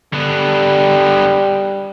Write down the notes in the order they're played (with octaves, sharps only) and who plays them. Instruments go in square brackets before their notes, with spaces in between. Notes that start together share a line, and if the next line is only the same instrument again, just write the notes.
[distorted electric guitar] D3 B3 [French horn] G3